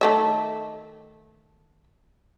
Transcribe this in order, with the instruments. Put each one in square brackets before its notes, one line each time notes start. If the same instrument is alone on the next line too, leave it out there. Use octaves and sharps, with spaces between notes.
[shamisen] D#3 A3 E5